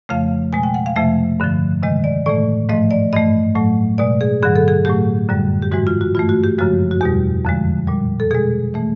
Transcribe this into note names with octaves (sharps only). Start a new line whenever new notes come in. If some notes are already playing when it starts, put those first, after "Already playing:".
F2 C#3 F3 A3 F5
B2 G#3 G#5
G5
F#5
F5
F2 C3 F3 A3 E5
G2 D3 F3
C3 D#3 G#3 D#5
D5
A2 E3 A3 D5
G#2 F3 A3 D#5
D5
G2 E3 A3 D#5
A2 F#3 A3
B2 G#3 D5
G#4
G2 D3 F#3 G#4
A4
G#4
A2 F#3 A3 G4
F#2 D3 G3
G4
G#2 E3 G#3 F#4
F4
F#4
G2 E3 A3 F4
F#4
G4
F#2 C#3 F3 G#3 F#4
F#4
E2 B2 G3 G4
F2 D3 F3 G#3
A#2 G3
A4
B2 G#3 G#4
E3 A3